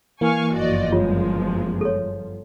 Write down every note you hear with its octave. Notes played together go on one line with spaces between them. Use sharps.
E3 A#3 F5 G#5 C#6
G1 F#2 F3 F#4 D5 D#5
G#3 F4 C#5
A4 C#5